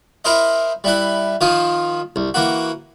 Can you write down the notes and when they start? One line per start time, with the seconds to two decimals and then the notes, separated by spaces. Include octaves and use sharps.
0.25 E4 A#4 C5 D#5
0.84 G3 E4 B4
1.41 D#3 F3 F4 D#6
2.16 C2
2.34 E3 A#3 F#4